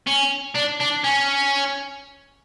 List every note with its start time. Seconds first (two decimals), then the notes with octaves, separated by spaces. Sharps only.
0.07 C#4
0.56 D4
0.81 D4
1.04 C#4